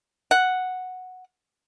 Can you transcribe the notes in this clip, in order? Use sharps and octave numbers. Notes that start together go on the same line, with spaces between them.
F#5